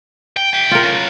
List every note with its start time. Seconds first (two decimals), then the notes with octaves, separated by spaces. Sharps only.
0.37 G5
0.54 E5 G5
0.71 F4 A#4
0.84 C#3 F#3